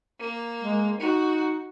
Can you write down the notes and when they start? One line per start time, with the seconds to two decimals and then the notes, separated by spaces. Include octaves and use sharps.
0.20 A#3
0.62 G#3
1.00 D#4 F#4